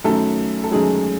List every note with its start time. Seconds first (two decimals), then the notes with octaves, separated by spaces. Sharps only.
0.04 F#2 D#3 F#3 A3 A4
0.64 A4
0.71 F#2 D#3 F#3 G#3 G#4